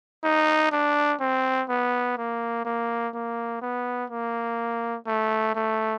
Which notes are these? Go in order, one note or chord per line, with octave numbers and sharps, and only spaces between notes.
D#4
D4
C4
B3
A#3
A#3
A#3
B3
A#3
A3
A3